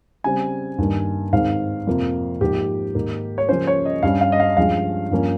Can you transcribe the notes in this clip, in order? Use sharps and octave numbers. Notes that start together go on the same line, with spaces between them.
C#3 G3 C4 G#5
G2 D#3 A#3
G#2 D#3 G#3 C4 F5
F2 C3 F3 A#3
G#2 F3 A#3 G4
G#2 D#3 A#3
C#5
C#3 F3 A#3 C#4 C5
C#5
D#5
G2 G3 C#4 F5
F5
D#5
F5
G2 F3 G#3 C#4 F5
G2 F3 A#3 C#4